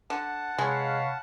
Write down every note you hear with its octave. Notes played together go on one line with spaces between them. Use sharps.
D3 F#5 A5
C3 G#3 B4 C#5 F5